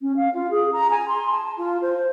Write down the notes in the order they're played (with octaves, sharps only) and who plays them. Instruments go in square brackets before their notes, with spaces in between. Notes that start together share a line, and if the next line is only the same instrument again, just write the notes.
[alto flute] C#4
F5
F4
G#4
A#5
G#5
C6
A5
F4
C5